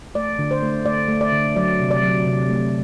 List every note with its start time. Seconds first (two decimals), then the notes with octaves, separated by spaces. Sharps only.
0.15 A3 D5
0.39 D3
0.51 C5
0.63 A3
0.85 A3 D5
1.08 A3
1.21 D5
1.32 D3
1.56 F#3 D5
1.80 C3
1.91 D5
2.03 F#3
2.26 C3
2.50 A3